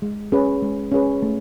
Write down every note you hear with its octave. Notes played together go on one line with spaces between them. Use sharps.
G#3
C#4 G#4 B4
G#3
C#4 G#4 B4
A3